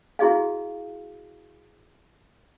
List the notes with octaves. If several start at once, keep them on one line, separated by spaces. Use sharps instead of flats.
E4 F#4 G#4 D#5 F5